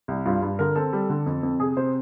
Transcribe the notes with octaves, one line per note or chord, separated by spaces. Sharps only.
C2
G2 F4
G2
D3 A#4
C4 A4
G3
D3
F2
F2
C3 G#4
C3 C5